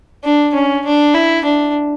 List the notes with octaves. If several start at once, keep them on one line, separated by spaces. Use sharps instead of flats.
D4
C#4
D4
E4
D4